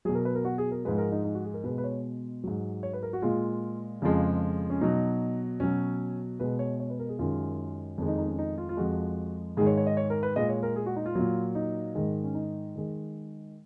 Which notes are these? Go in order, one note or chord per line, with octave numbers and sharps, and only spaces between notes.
B2 F#3 G#4
A#4
B4
A#4
F#4
G#4
A#4
G#2 F3 G#3 B4
A#4
D#4
D#4
F#4
G#4
A#4
B2 G#3 B4
B4
C#5
G#2 F#3
C#5
B4
A#4
F#4
A#2 G#3 F4
F2 C#3 F3 G#3
C#4
B2 F#3 D#4
B2 F#3 C#4
B2 G#3 B4
C#5
C#5
B4
A#4
G#4
F#2 D#3 G#3 F4
F2 D#3 G#3
D#4
D#4
C#4
D#4
F4
F4
F2 F3 G#3 F#4
G#2 D#3 G#3 G#4
C#5
C#5
D#5
C#5
A#4
B4
A#2 G#3 D#5
C#5
A#4
G#4
F#4
D#4
F4
A#2 F#3
D#4
G#2 D#3 G#3
C#4
D#4
D#3 G#3